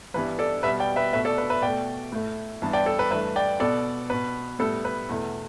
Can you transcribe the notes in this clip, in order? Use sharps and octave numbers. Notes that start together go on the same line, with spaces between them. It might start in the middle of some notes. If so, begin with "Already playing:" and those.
G2 E3 G3 B3 B4
A4 D5
B2 G3 B3 B4 E5
D5 G5
B4 E5
B2 A3 B4 E5
A4 D5
B4
B4 E5
B2 A3 D5 G5
A2 A3
G2 E3 B3 A5
D5 G5
A4
B4
G2 E3 A3 B4 E5
D5 G5
B2 B3 A4 D5
B2 B3 B4
A2 G3 B3 A4
B4
E2 B2 A3